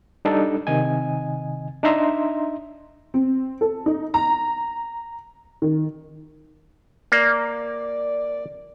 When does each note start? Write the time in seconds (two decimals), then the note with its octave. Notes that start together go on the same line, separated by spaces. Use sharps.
0.25 G3 D4 D#4 A4
0.67 C3 D#3 D#5 G#5
1.83 D4 D#4 D#5 E5 A#5 C6
3.14 C4
3.61 A4
3.86 D#4
4.14 A#5
5.62 D#3
7.12 A#3 D5